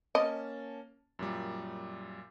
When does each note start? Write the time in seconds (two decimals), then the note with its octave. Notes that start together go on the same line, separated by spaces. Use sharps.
0.15 A#3 C#4 D#5 A5
1.19 F#2 A#2 G3